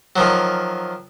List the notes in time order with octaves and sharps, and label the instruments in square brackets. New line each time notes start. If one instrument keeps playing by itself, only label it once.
[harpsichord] D#3 F3 F#3